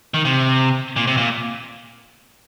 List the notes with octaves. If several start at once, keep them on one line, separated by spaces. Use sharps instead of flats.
D#3
C3
A#2
C3
A#2